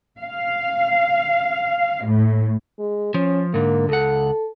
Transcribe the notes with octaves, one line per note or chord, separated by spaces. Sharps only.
F5
A2
G#3
F3 C#4
G#2 D3 A#3
C#2 A4 F#5